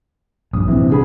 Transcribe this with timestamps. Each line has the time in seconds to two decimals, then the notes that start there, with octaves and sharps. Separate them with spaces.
0.53 A#1 G2 D#6
0.68 C3 E3
0.90 D3 G#4 B5